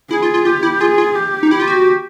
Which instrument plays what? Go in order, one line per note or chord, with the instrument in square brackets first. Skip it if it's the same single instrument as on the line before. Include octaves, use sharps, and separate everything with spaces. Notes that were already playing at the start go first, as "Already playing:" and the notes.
[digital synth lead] E4 [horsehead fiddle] G#4
[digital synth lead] F4
F4
[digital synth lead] F4 [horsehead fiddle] G4
[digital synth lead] E4
[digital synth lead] F4 [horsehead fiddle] G#4
[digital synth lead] F4
[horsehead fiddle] G4
[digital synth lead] D#4
[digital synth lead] E4 [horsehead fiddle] G4
[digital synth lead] F4
F#4